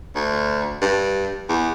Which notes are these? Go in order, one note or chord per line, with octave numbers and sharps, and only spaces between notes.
D2
G2
E2